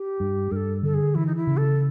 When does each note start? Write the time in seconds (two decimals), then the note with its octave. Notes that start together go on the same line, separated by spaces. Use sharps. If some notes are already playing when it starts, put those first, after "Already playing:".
Already playing: G4
0.20 G2
0.51 G2 A#4
0.56 A4
0.83 D3 A4
0.94 G#4
1.15 E3 E4
1.26 D#4
1.36 E4
1.47 C#3
1.57 A4